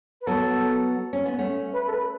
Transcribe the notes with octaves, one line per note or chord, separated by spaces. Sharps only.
B4
F#3 B3 A4
C#4
B3
A3 C#4
B4
A4
B4